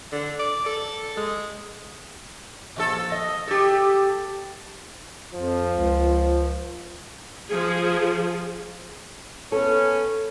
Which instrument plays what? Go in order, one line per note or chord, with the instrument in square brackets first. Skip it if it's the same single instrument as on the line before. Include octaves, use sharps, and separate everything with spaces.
[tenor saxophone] D3
D5
A4
G#3
[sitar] A#2 F3 A4
D#5
G4 A4
[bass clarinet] F2 [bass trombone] F3
[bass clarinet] C#2
[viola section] F3 G#4
[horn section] B3 C#4 [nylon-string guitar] A4